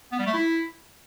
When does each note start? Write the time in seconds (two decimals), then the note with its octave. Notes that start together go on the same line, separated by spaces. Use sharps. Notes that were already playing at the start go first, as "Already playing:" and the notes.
0.12 B3
0.19 G3
0.26 A3
0.34 E4